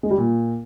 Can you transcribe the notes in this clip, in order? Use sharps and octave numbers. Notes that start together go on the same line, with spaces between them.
G#3
G3
A#2